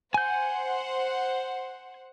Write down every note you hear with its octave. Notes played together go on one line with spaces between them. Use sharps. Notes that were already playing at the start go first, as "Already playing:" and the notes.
C5 F#5 G#5 G6